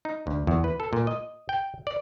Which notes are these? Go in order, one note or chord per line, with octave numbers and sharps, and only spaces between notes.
D#4
D2
E2
B4
A4
A#2
D#5
G5
D5